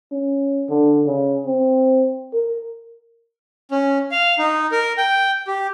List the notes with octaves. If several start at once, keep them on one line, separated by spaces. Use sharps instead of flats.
C#4
D3
C#3
C4
A#4
C#4
F5
D#4
A#4
G5
G4